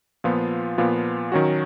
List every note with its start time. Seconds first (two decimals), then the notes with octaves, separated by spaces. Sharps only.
0.24 A#2 F3 B3 F4
0.78 A#2 F3 B3 F4
1.32 D#3 F#3 C#4 F#4